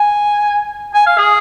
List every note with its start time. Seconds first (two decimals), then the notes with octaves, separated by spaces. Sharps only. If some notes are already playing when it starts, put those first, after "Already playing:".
Already playing: G#5
0.94 G#5
1.06 F5
1.18 G#4